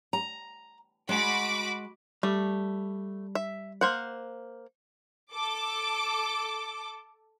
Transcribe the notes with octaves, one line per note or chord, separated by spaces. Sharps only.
A#5
G#3 F#4 B5 D6
G3 A3
E5
A#3 C5 F#5
A4 D6